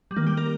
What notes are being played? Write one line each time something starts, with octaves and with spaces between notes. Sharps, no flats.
G3
D#3 A#3
G3 G4
A#3 A#4